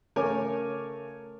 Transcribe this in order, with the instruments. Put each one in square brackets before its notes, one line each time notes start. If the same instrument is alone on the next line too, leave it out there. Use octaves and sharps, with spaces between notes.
[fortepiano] C#3 A3 A#4 C#5 G#5 D6